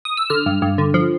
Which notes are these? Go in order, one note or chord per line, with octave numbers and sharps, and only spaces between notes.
D#6
E6
D3 F6
G2
G2
D3
F3